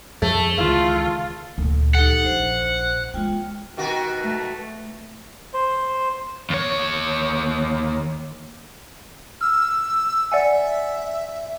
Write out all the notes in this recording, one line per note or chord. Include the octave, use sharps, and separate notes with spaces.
F2 A3 G#4
C#2 D#3 E3 F4 F5
D2 A#2
D#4 G4 A4 F#5
A#1 C5
G#3 A3 F4 G5
B2 D#3 F#4
A3
C5
D#2 C#5
E6 F6
D5 E5 F#5 G#5